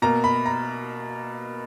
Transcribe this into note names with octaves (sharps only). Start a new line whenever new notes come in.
B2 A#3 A#5
B5
A#5